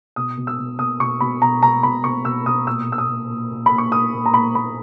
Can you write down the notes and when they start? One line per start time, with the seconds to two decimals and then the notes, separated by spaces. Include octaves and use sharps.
0.16 B2 D#6
0.37 B2
0.47 E6
0.59 B2
0.79 B2 D#6
1.00 B2 C#6
1.21 B2 B5
1.42 B2 A#5
1.62 B2 A#5
1.83 B2 B5
2.04 B2 C#6
2.25 B2 E6
2.46 B2 D#6
2.67 A#2 E6
2.88 A#2 E6
2.98 D#6
3.08 A#2
3.30 A#2
3.51 A#2
3.66 B5
3.71 A#2
3.78 C#6
3.92 A#2 D#6
4.14 A#2
4.26 A#5
4.34 A#2 B5
4.55 A#2 B5